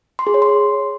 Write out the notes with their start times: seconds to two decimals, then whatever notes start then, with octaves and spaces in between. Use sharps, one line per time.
0.19 C6
0.27 G#4
0.34 C#5
0.42 C6